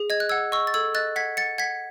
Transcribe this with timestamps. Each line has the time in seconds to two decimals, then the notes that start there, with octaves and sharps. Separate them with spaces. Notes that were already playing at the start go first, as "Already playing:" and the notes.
Already playing: G#4
0.10 D#5 G#6
0.20 F#6
0.29 F#5 E6 G#6
0.52 D#5 C#6 E6
0.67 A6
0.74 A4 E6 G#6
0.95 D#5 F#6 A6
1.16 F#5 G#6 B6
1.37 F#5 A6 C#7
1.58 F#5 G#6 B6